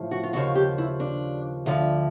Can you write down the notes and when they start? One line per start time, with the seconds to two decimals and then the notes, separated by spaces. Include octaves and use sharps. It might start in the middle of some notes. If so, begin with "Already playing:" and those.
Already playing: A2 F3
0.11 F#4
0.23 F4
0.33 D#2 C#3 F3 F#4
0.55 G4
0.78 E4
1.00 D4
1.66 D2 D3 F3